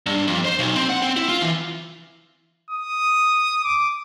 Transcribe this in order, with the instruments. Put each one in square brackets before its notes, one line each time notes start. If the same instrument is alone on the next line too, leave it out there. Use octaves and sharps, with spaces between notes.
[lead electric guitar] G2
F2
C5
B1
C4
F#5
C4
E4
F4
E3
[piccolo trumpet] D#6
D6